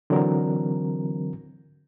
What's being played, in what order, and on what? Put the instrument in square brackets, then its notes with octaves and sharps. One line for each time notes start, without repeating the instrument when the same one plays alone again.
[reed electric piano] D3 E3 F#3 C4 A#4